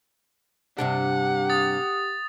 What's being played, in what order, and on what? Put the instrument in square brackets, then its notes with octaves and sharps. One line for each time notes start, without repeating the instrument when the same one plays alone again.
[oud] G2 C3 D4 [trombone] G4 [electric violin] F#5
[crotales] D#6 A6